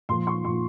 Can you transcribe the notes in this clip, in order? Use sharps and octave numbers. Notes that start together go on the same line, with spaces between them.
A#2 F3 C6
C#6
A#2 F3 C6